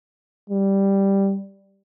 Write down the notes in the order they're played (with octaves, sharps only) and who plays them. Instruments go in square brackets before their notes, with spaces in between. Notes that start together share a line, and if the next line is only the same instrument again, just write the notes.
[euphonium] G3